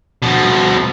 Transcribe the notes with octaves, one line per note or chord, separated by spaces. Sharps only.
B2 F3